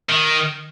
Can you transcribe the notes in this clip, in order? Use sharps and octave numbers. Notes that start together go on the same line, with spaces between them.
D#3